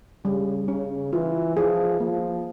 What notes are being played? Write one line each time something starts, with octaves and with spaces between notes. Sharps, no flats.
C#3 G3
C#3 C#4
E3 F4
F3 G#4
F3 A#3